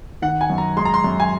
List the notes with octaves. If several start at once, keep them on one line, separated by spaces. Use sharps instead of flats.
D#3 F#5
G#5
F#2
A#5
G#3 C6
A#5
C6
F#2
G#5